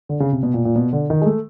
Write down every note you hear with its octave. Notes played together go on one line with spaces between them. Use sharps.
D3
C#3
C3
B2
A#2
A#2
B2
D3
D#3
G#3
A3